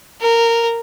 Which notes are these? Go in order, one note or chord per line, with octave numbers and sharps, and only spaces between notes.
A#4